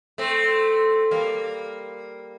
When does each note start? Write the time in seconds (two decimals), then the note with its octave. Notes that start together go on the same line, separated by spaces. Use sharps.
0.18 A3 C4
1.11 G3 A#3